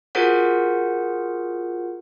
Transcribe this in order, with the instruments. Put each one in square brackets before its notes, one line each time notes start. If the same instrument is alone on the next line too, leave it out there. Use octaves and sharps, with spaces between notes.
[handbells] F4 F#4 G#4 A#4 C5 F#5